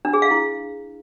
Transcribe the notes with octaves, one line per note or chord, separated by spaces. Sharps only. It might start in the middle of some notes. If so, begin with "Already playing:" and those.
D4
G#4
F5
E4